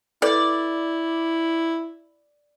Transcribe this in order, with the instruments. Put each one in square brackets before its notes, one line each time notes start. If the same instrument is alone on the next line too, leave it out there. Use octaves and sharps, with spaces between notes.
[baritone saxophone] E4 [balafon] A4 B4 [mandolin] D5